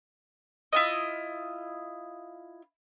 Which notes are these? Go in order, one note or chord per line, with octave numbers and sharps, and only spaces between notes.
E4 F4 D#5